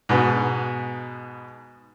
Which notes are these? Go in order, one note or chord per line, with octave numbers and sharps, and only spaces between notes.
G#2 B2 B3